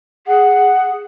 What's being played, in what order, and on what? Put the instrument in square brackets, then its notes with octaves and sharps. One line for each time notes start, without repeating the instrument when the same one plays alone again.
[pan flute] G#4 [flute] F#5